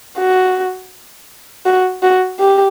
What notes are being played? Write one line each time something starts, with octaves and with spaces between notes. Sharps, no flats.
F#4
F#4
F#4
G4